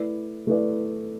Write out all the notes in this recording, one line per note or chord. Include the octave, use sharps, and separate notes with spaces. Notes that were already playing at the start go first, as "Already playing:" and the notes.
Already playing: A3 E4 B4 D5
A3 E4 B4 D5